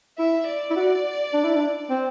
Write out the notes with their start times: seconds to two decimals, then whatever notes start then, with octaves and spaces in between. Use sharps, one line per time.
0.19 E4 E5
0.47 D5
0.70 E4
0.76 F#4
1.33 D4
1.44 E4
1.56 D4
1.90 C4